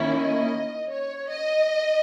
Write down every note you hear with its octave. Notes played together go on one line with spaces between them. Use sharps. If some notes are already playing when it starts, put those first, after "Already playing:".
Already playing: D#3 A#3 C#4 E4
D#5
C#5
D#5